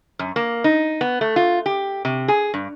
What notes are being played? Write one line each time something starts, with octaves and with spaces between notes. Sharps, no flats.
F#2
A#3
D#4
B3
A3
F4
G4
C3
G#4
G2